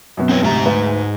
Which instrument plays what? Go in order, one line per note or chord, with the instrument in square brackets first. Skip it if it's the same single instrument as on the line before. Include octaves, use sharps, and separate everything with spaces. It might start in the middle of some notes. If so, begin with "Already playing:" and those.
[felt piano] F#2 B2
[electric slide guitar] C4 B4 C#5
[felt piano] D2 C3 [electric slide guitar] G#2 G4 A#5
[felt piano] D2 B4